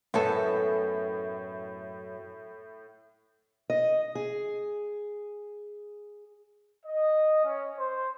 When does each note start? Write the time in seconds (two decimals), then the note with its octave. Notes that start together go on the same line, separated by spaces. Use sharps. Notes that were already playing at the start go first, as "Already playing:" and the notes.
0.14 F#2 A2 B3 A4
3.70 D#5
4.15 G#4
6.86 D#5
7.45 C#4
7.78 C5